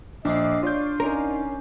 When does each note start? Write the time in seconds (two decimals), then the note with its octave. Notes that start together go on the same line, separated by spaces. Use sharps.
0.25 A#1 D4 D#5 D6 C7
0.63 F4 C#5 D5 G6
1.00 C#4 D#4 A#4